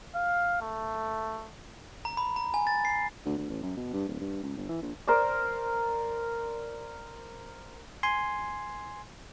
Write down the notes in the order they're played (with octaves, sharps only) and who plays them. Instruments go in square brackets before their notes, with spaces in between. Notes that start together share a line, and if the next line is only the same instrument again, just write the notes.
[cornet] F5
A3
[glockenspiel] A#5
B5
A#5
G#5
A6
C7
[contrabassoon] D2
D2
A1
F#2
B2
G2
D1
G2
C#2
G1
E3
A#1
[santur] A#4 C5 D5
[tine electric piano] G#5 C6